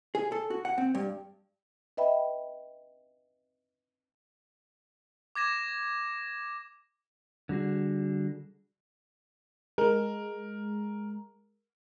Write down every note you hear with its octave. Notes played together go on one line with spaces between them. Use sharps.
G#4
A4
F#4
F#5
C4
G2
B4 D#5 E5 G5 B5
D6 G#6 A#6 E7
D3 G3 F#4 G#4
G#3 A#4